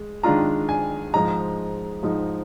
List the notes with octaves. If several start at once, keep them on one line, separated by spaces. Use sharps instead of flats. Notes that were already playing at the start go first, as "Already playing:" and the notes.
Already playing: G#3
D#3 G#3 D4 F4 A#5
G#5
G#2 F3 G#3 D#4 A#5
G#2 F3 G#3 D#4